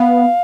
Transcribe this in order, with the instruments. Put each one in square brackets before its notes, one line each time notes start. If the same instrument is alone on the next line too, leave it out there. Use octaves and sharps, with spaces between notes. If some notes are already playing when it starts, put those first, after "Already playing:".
Already playing: [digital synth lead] B3 [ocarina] F5